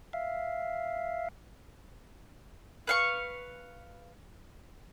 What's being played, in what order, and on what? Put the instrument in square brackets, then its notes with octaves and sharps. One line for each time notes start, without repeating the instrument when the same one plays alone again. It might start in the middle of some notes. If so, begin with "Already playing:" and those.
[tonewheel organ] E5 F5
[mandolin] B4 F5 C#6